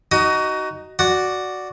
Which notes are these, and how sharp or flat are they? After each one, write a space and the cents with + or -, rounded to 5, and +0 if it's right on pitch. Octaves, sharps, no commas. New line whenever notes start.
D#4 +0 F#4 +25 D#6 +15
F#4 +0 D5 +0 F#5 +0